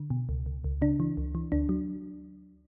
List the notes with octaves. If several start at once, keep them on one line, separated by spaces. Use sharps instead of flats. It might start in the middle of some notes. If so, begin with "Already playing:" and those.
Already playing: D3
B2
C#2
C#2
C#2
C#3 D4
E3
C#2
E3
D2 D4
F#3